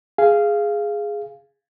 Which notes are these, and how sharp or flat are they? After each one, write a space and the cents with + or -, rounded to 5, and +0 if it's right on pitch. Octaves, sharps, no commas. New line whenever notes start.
G#4 +0 F5 -10